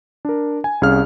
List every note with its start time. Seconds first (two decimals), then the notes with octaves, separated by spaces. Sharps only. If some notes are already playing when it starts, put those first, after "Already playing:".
0.25 D4 A#4
0.64 G#5
0.82 C2 C#4 G#4 F5 F6